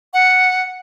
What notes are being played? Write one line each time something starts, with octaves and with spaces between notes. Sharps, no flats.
F#5